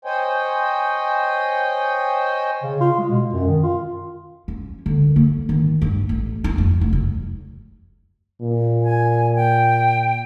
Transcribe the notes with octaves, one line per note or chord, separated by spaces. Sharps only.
C5 C#5 D#5 G5 G#5
C#3
F4
G#3
B2
F#2
D#3
F4
C#4
D3
A#3
D#3
G2
A1
E4
F2
F1
F#2
A#2
G#5
G5